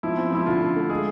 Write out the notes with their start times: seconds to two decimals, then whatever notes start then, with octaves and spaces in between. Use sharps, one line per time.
0.03 F3 E4
0.17 C4
0.32 F3 E4
0.46 D3 F4
0.61 D3
0.76 A3
0.90 G#3 G#4